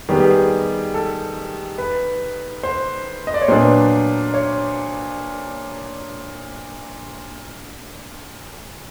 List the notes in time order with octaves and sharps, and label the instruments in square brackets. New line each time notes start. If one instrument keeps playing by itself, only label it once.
[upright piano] D#3 G3 B3 [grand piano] G#4
[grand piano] G4
G#4
A4
B4
C5
D#5
D5
C#5
[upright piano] A#2 F#3 B3 D4 [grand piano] C5
[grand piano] C#5